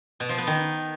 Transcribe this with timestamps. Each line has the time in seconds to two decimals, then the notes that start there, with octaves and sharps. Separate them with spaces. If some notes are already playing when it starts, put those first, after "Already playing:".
0.20 B2
0.29 F3
0.38 B3
0.47 D#3